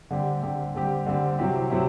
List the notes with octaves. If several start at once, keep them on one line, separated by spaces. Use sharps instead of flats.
D3 G3 C4 G4
D3 G3 C4 G4
D3 G3 C4 G4
D3 G3 C4 G4
C3 F#3 C4 E4 G4
C3 F#3 C4 E4 G4